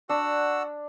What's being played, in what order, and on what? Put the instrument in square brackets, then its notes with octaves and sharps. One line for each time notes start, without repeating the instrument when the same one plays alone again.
[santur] D4 [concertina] F#4 F#5 E6